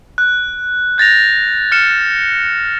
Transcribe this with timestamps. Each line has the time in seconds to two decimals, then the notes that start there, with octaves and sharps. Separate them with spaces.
0.18 F#6
0.98 G6 A6 A#6 F7
1.72 F6 C#7 E7